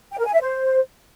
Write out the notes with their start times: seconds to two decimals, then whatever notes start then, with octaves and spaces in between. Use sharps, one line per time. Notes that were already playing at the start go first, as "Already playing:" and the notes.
0.12 G5
0.19 A#4
0.26 G#5
0.33 E5
0.41 C5